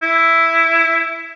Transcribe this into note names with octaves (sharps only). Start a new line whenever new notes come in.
E4